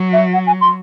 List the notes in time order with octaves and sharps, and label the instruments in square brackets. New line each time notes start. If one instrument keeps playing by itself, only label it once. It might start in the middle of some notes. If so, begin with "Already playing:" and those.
Already playing: [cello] F#3
[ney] E5
F#5
G#5
C6